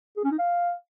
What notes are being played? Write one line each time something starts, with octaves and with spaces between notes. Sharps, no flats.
G#4
C#4
D#4
F5